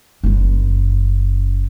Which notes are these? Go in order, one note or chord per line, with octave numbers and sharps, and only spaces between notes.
F#1 F#2